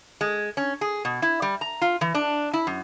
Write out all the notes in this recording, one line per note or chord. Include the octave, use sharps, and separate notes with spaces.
G#3
C#4
G#4
B2
E4
G3
A#5
F4
E3
D4
E4
F#2